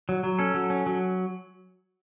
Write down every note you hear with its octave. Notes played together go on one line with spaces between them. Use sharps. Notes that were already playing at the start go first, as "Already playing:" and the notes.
F#3
F#3
C#4 A4
F#3
C#4
F#3